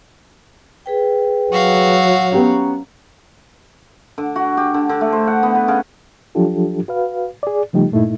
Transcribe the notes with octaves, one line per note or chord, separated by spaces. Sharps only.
G#4 B4 G5
F#3 F#4 F5
B3 C#4 G4 C#5 A#5
D3
F#4
G4
D3
D3
A3
C5
F#5
B3
B4
C#3
F3 F#3 D4 F4 G4 A4
F#4 B4 F5
G#4 D5
C#3 F3 G3 A3 D#4 G4
G2 A#2 A3 A#3 D#4 E4